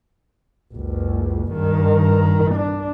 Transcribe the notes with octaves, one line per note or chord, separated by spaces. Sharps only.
F#1 C#2
G2 D#3
D4